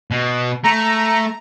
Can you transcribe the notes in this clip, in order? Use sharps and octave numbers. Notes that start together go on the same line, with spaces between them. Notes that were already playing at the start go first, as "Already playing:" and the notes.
B2
A3 A#5